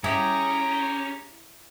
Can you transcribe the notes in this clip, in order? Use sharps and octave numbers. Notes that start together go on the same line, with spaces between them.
C#4 E4 G4 G#4 A#5